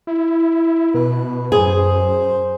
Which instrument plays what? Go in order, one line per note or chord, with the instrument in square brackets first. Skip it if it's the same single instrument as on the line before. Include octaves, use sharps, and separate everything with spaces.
[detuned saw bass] E4
[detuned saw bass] B2 [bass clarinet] B4
[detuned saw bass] F#2 [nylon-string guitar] G#4 [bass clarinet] C5